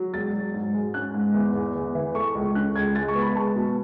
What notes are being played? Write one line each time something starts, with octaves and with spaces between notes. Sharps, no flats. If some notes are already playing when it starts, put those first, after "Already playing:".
Already playing: F#3
E1 A6
F#3
G#2
G#3
C#4 F#6
G#2
E2
E2
E2
E3
A3 C#6
C#2
C#4 F#6
C#2 G#6
G#3 A6
C#6
B3
B5
G#3 A5
B2